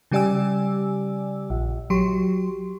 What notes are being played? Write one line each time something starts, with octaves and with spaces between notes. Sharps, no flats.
C#3 G3 G4 D5 G#5 E6
A#1
F#3 G4 C6